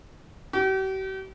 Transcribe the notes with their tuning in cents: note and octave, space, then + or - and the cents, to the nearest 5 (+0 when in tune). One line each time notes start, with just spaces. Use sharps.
G4 -45